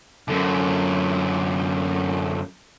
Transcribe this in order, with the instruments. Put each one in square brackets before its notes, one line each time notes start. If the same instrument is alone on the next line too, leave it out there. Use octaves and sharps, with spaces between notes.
[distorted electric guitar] F#2 D3